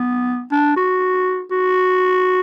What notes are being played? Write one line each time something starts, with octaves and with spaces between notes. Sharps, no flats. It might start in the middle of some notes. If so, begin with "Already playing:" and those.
Already playing: B3
D4
F#4
F#4